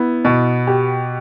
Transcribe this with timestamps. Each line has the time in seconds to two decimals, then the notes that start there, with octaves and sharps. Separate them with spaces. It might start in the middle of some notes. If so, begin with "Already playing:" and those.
Already playing: B3 E4
0.25 B2
0.67 G4